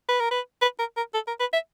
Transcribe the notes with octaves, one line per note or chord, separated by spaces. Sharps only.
B4
A#4
B4
B4
A#4
A#4
A4
A#4
B4
E5